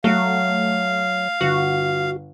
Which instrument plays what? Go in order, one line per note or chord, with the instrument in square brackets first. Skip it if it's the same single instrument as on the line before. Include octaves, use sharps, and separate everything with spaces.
[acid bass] F#3 [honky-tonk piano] A3 [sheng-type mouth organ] F5
[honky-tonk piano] G1 [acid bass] F#4